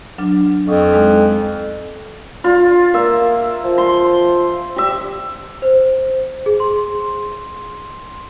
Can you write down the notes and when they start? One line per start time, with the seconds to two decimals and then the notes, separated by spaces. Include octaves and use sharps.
0.18 F#3 D4 F6
0.67 F2 F5 C#6 D#6
0.93 G#3 D#4
2.44 F4
2.94 A#3 E5
3.64 F3
3.78 C6
4.76 G4 E5
5.62 C5
6.46 G#4
6.60 C6